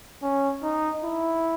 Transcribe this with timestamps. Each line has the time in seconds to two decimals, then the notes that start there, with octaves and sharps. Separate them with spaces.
0.22 C#4
0.63 D#4
1.04 E4